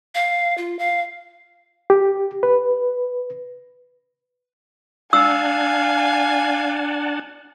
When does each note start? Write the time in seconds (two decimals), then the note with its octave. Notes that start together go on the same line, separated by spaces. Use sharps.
0.15 F5
0.58 F4
0.79 F5
1.90 G4
2.43 B4
5.13 D4 F5 F#5 G#5 A5 E6